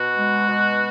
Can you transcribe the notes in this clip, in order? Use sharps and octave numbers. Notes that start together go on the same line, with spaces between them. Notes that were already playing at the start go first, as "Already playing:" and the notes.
Already playing: B2 F#4
G#3
B2